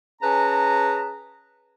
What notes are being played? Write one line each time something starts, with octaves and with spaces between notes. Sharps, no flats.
C#4 G#4 B4 A5 A#5